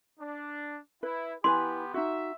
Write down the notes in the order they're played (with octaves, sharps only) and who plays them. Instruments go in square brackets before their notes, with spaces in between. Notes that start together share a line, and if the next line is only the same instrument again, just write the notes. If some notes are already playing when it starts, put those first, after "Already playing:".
[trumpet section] D4
[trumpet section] E4 [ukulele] B4
[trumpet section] B3 G4 [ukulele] E4 B4 G#5 [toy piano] C6
[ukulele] D#4 F#4 [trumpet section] E5